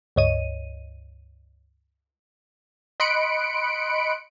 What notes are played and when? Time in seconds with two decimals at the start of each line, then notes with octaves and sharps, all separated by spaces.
0.16 C#2 G2 C#5 D#5 D#7
3.00 D#5 B5 C6 F#6 C#7 D7